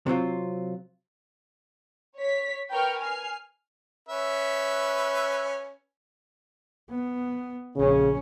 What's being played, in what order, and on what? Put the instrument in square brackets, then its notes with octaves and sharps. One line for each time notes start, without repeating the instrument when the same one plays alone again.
[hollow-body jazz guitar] C3 F#3 C4 F4
[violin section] C#5 B6
A#4 B4 G5 C#6 F6
G#5 F6 C7
[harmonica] C#4 B4 E5
[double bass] B3
[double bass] A#1 C#4 [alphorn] C#3